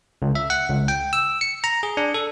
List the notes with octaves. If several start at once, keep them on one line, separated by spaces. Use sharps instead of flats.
C#2
E5
F#5
C#2
G5
E6
C#7
A#5
G#4
D4
A4